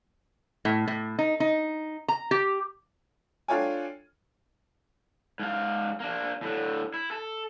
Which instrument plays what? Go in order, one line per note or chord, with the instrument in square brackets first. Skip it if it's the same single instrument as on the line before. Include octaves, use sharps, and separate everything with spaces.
[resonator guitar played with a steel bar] A2
A2
D#4
D#4
A#5
G4
[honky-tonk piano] D4 F4 A4 C#5 G5 G#5
[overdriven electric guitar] G#2 F5
A#3 D4
A2 D3
E4
A4